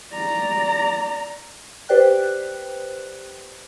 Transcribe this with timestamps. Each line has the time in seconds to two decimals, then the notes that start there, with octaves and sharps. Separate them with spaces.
0.13 D5 A#5
1.89 G4 B4 C5 D5 G5 F#6